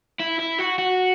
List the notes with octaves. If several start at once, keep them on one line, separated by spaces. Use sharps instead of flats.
E4
E4
F#4
F#4